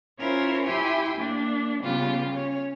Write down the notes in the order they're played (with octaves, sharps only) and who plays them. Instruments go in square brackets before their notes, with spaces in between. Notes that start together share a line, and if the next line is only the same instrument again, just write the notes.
[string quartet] C#4 E4 F4 A#4 C5 C#5
E4 G4 E5 G5 G#5 C6
A#3 D4
C#3 G3 B3 F4 G4
C#4 C#5